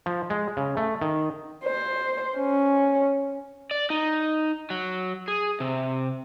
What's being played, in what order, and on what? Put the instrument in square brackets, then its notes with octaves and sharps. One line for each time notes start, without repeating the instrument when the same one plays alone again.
[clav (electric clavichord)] F3
G#3
C#3
A3
D#3
[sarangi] C5
C#4
[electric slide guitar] D5
D#4
F#3
G#4
C3